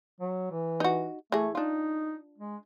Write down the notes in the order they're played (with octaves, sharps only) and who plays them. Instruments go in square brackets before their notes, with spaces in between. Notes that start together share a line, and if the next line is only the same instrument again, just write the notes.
[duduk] F#3
E3
[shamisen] D#4 F#4
[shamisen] E3 G#4 [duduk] A3
[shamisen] D4 F4 [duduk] D#4
[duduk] G#3